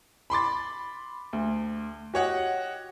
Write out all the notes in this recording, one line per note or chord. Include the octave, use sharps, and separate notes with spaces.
B5 C6 D6 A6
D2
F#4 G4 C#5 D#5 F#5